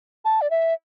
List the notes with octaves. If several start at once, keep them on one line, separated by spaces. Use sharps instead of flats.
A5
D5
E5